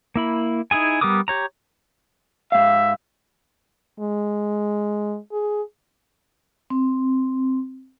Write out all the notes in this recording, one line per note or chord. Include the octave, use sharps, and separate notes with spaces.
A#3 E4 B5
D#4 E4 G#4 G#5
G3 B3 A#4 D6 D#6
G4 C#5 A#5
G#2 E5 F5
G#3
G#4
C4